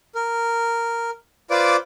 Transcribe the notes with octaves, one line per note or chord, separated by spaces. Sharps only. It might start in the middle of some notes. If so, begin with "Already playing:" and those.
A#4
F4 B4 C5 D5 D6